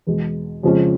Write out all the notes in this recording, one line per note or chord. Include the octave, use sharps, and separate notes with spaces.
E2 B2 G#3
F2 C#3 F3 G#3 C#4